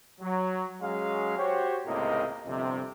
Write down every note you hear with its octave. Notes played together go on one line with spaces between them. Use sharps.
F#3
F#3 G#3 C#4 G#4 F5
F#4 G4 C5 C#5
C#2 A2 C3 A#3 D#5
G1 F2 C3